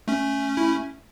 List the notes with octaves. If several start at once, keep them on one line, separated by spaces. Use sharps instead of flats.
A3 C#4
E4